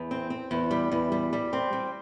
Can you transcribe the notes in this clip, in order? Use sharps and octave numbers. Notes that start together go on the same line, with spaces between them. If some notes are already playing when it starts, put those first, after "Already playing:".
Already playing: E2
C4
C4
E2
G3
E2
G3
G3
C4
G3